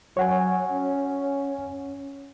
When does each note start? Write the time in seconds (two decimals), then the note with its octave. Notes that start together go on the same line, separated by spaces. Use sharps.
0.17 F#3 C#5 F#5 G#5
0.71 C#4